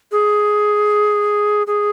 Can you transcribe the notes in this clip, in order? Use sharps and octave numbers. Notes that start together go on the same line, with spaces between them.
G#4
G#4